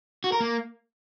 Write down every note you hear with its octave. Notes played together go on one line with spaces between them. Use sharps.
F#4
A#4
A#3